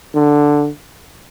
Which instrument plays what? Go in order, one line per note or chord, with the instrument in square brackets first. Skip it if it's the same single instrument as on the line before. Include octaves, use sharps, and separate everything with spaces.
[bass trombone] D3